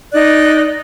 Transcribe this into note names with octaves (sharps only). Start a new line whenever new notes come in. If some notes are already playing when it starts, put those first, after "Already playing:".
D#4 D5 F#6